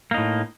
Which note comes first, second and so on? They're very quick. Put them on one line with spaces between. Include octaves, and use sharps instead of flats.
A#3 D#4 A2